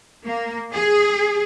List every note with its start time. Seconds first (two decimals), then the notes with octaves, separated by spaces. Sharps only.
0.25 A#3
0.74 G#4